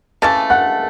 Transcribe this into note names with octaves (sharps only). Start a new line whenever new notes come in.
C#3 E3 A3 A5 A6
F#5 F#6